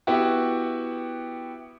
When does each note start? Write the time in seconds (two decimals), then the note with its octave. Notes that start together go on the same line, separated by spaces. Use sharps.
0.07 B3 E4 F#4 G4